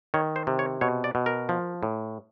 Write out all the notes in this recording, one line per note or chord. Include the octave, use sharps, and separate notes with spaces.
D#3 C#5
C5
C3
C#5
B2 C#5
D5
B2
A#4
F3
A2